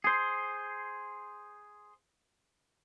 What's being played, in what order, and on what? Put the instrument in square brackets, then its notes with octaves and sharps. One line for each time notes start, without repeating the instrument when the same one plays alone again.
[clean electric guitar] G#4 C5